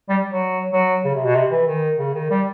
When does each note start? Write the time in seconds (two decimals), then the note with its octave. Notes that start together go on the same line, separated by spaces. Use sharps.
0.09 G3
0.31 F#3
0.73 F#3
1.05 C#3
1.15 C3
1.25 B2
1.35 C3
1.52 E3
1.68 D#3
1.99 C#3
2.15 D#3
2.31 G3